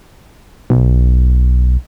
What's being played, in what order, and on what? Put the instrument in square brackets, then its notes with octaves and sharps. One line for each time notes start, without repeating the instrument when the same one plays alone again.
[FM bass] B1